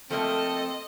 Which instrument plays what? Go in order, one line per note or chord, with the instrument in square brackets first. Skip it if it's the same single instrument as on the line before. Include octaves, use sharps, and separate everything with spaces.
[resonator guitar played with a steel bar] F3 A3 A#3 [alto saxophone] C4 [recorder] A4 [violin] D#5